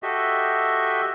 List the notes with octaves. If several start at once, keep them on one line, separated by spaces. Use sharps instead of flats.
F#4 G4 A4 D#5 E5